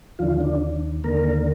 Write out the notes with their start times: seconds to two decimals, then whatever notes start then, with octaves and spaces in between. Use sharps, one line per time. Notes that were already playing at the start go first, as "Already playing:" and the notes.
0.19 D#2 D3 F3 F4
0.40 D3 D4
1.04 D#2 D3 A#3 A#4